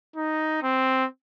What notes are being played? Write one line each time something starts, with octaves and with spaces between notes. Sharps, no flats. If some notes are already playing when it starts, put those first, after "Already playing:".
D#4
C4